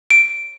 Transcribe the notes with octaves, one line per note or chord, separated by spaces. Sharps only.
D7